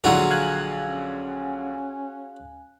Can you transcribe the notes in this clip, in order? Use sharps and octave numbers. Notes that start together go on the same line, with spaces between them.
A#1 D3 F#3 F4 F#4 G#4
F5 G#5 F#6
C#4